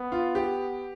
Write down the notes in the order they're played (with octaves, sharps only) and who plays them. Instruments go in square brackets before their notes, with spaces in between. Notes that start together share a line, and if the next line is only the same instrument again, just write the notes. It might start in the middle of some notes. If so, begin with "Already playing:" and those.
Already playing: [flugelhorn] B3
[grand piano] F4
G4